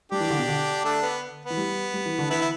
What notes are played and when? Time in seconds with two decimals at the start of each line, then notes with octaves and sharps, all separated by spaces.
0.11 G3 D4 G4
0.20 E3
0.30 D3
0.38 B2
0.48 D3
0.84 A3 D4
1.02 B3
1.45 B3
1.50 E3
1.57 G3
1.94 G3
2.06 E3
2.18 D3
2.30 E3 B3 E4
2.42 E4